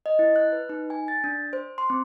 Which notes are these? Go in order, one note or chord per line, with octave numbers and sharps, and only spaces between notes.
D#5
E4
F#6
B4
D#4
G#5
A6
D4
C5
C6
C4